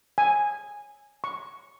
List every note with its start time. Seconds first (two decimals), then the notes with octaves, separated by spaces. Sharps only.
0.18 G#5
1.24 C#6